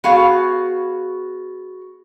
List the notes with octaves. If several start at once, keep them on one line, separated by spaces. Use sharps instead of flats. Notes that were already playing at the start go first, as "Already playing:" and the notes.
B3 F#4 G#4 F5